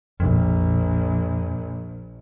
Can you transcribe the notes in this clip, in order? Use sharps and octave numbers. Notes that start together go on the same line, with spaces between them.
A#1 F2